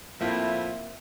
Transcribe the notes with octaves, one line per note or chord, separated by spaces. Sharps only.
A2 F3 A#3 C4 E4 E5